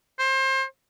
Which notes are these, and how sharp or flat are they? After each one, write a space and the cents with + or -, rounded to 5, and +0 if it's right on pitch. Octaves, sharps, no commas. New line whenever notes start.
C5 +30